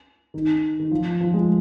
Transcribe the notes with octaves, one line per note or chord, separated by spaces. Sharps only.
D#3
D#3
F3
F3
G#3